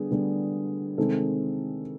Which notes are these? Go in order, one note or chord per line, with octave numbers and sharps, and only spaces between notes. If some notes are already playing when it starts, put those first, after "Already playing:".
Already playing: D3 G3 B3 G#4
D3 G3 B3
C3 D#3 G#3 C4 A4